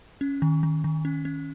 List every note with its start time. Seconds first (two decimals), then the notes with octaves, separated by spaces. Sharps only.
0.21 C#4
0.42 D#3
0.63 D#3
0.84 D#3
1.05 C#4
1.25 C#4